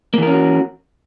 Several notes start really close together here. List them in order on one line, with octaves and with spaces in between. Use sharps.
A#3 E3 A#4 C#4 F#4